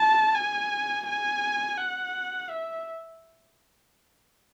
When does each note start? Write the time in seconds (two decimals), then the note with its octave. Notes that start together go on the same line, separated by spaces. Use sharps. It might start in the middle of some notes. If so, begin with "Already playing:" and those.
Already playing: A5
0.35 G#5
1.07 G#5
1.78 F#5
2.49 E5